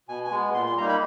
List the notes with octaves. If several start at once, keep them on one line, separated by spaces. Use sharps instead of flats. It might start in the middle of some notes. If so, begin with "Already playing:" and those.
B2 G#5
G#5
G#3 B3
A#2 C6
C6
G3 A#3 D#4 A#5
B5